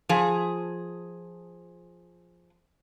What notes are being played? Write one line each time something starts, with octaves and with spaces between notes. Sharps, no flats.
F3 G#4